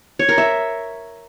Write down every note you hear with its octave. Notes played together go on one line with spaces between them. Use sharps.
C#5
A#4
E5